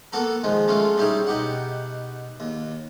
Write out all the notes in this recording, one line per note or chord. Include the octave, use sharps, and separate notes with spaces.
A#3 B3 F#4 A4 A#4
D#3 F3 G#3
F#3 G#3 A3 C#4 F4
G3 C#4 D#4 E4 G4 G#4
B2 D#4 G4 F#5
D#2